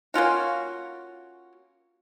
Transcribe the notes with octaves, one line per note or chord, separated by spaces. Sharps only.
A#3 C#4 F4 F#4